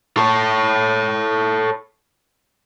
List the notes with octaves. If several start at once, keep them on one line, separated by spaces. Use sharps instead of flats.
A4 C#5